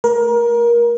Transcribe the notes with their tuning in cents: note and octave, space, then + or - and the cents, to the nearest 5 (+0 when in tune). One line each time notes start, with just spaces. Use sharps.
A3 +0 A#4 +25